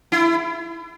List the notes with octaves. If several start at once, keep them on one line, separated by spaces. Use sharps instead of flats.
E4